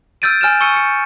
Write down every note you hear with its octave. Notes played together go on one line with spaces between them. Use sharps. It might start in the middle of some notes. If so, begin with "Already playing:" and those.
E6 F6 G6 A6 D7 D#7
G#5 F6 G6 E7
C#6 E6 C#7 D#7
G6 C#7